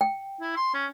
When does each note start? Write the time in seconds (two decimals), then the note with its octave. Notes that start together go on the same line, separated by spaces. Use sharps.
0.01 G5
0.41 E4
0.57 C6
0.74 C#4